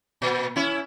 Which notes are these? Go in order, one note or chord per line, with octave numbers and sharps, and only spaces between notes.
A#2
C#4 E4